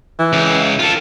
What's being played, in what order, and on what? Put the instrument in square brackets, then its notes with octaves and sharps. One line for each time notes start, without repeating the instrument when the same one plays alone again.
[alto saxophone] E3
[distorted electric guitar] C#2
F4 A4